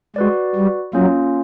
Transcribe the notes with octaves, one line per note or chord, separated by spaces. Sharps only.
G#3 F#4 B4 D5
G3
F#3 A#3 C#4 F4